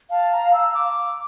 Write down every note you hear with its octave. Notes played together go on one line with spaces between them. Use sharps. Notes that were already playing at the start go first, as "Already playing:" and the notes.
F5 A5
A#5
E6
D6